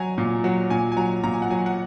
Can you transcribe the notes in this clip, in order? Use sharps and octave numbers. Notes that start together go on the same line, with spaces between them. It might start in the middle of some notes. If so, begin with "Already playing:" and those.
Already playing: F#3 G#5 A#5
A#2
F#3
A#2 G#5
G#5
F#3 A#5
A#2 A#5
G#5
F#5
F#3 G#5
F#5